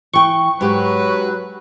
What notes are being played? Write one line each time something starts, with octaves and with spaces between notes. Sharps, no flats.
E3 G5 C#6
G#2 F#3 G4 B4